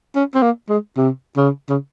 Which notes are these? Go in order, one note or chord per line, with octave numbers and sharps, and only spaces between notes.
C#4
C4
A#3
G#3
C3
C#3
C#3